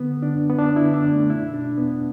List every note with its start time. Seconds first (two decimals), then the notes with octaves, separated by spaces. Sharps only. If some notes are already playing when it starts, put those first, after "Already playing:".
Already playing: D3 B3
0.11 D3
0.22 D4
0.34 F#2
0.50 B3
0.58 D3 D4
0.76 E4
0.82 D3
0.94 D4
1.06 F#2
1.12 A3
1.30 B2 E4
1.53 B2 D4
1.77 E2 B3